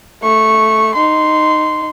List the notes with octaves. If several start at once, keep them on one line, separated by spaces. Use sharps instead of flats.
A3 C#6
D#4 C6